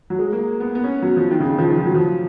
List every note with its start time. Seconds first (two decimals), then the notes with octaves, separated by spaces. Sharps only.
0.10 F#3
0.19 G#3
0.32 A#3
0.60 B3
0.75 B3
0.84 C#4
1.02 F#3
1.17 F3
1.31 D#3
1.40 C#3
1.49 D#3
1.59 F3
1.68 D#3
1.78 F3
1.86 F#3
1.95 F3